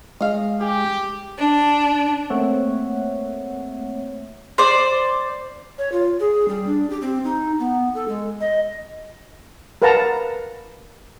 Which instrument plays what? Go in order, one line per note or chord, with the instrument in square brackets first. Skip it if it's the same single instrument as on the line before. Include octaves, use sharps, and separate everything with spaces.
[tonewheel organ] G#3 [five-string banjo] D#5 F5
[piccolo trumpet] G4 [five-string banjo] G#4
[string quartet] D4
[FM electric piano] A3 A#3 C4 C#5 E5 F#5
[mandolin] C5 D5
[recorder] C#5
F4
G#4
G3
D4
G4
C4
D#4
B3
A4
G#3
D#5
[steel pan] A#4 B4 F5 F#5 A5 A#5